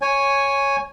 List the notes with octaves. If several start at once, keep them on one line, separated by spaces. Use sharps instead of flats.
C#5 G#5